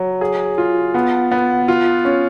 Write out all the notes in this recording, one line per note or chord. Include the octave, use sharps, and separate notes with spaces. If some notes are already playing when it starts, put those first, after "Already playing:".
Already playing: F#3
G#4
F4
B3
B3
F4
C#4